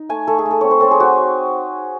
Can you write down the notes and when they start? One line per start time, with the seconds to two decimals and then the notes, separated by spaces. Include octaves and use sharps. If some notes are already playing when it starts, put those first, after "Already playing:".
Already playing: D#4
0.09 A3 G#5
0.27 A3 A4
0.39 G#4
0.46 A3
0.51 A4
0.61 C4 C#5
0.71 C5
0.80 C4 A4
0.91 G#4
1.00 F#3 F#4